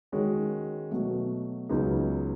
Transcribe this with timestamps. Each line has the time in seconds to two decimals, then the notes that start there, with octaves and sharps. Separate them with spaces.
0.12 D#3 G#3 C#4 F#4
0.91 B2 F#3 A3
1.69 C#2 C#3 F#3 B3 D#4